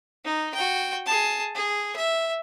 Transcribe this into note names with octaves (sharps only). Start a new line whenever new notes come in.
D#4
F#4 G5
G#4 A5
G#4
E5